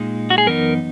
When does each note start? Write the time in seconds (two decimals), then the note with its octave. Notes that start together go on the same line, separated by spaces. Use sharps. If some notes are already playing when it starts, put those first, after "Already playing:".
Already playing: A#2 G#3 D#4
0.30 F#4
0.38 G#4
0.47 F#2 E3 B3 D#4 A#4